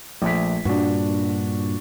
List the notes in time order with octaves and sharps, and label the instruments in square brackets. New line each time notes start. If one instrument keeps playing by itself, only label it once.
[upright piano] A#1 A3 B6
[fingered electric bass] G2 A#2 [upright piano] D4 F#4